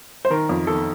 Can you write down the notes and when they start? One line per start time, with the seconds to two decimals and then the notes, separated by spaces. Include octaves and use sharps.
0.25 C5
0.30 D#3 A#4
0.49 F2
0.67 D#3 A4